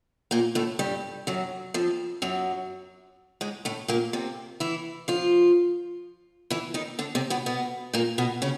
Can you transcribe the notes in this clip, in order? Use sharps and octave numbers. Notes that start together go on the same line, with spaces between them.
A#2 A#3
A2 A3
G2 G3
F#2 F#3
F2 F3
F#2 F#3
G#2 G#3
A2 A3
A#2 A#3
C3 C4
E3 E4
F3 F4
E3 E4
D#3 D#4
D3 D4
C3 C4
B2 B3
B2 B3
A#2 A#3
B2 B3
C#3 C#4